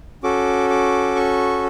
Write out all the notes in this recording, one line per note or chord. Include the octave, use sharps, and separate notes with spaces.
C#4 F#4 A4 D6
D6
C#6